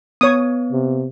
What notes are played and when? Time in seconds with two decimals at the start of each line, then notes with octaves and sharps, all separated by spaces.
0.21 B3 C#5 D#6
0.72 C3